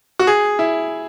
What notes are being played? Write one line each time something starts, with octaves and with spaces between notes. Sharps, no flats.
F#4
G#4
E4